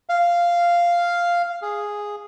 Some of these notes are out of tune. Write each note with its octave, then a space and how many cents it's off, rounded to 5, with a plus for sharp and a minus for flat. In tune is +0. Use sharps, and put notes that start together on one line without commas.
F5 -5
G#4 -5